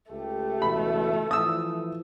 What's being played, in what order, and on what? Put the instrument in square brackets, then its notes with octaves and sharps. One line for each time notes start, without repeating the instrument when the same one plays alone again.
[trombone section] C#2 G4 [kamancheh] A3
[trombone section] C#2 B2 E3 [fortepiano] B5
[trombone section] E3 F3 [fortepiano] D#6 E6